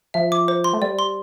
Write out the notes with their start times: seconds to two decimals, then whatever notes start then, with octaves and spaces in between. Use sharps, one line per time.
0.14 F3 E5
0.32 D6
0.48 C5
0.64 C6
0.73 A3
0.82 G3 D5
0.99 C6